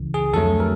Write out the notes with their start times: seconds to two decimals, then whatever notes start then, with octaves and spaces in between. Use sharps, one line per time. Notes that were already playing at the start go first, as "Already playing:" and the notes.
Already playing: C#2 C#3 E3
0.14 G#4
0.33 F2 D3 F#3 A3 A4
0.60 A#4